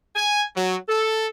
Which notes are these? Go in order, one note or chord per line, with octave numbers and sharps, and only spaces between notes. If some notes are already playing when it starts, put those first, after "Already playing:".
G#5
F#3
A4